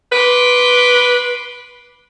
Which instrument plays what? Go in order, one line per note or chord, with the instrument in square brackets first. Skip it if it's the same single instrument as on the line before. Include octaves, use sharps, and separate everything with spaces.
[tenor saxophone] B4 [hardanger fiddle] C6 D6